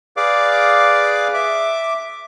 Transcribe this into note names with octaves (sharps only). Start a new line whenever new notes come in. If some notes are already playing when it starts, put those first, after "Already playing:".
G#4 B4 D5 F5 D6
E5 D6